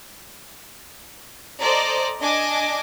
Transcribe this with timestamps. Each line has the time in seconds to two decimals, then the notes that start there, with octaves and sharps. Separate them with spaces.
1.60 A4 C5 D5 D#5 A#5
2.21 D4 D#5 G#5 D6 A#6